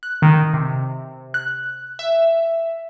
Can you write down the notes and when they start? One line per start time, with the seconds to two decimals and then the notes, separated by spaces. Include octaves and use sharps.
0.03 F#6
0.22 D#3
0.54 C3
1.34 F#6
1.99 E5